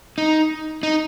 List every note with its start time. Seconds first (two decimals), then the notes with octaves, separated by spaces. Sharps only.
0.18 D#4
0.83 D#4